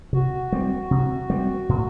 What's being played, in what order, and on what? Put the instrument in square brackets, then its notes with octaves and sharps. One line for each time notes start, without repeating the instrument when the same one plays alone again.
[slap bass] C3 [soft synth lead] F#4
[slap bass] G3 C4
C3
G3 C4
A2